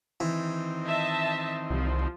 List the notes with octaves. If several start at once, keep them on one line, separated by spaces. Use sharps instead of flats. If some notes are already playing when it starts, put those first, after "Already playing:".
D#3 E3 C4
D#5 E5 A5
C2 F3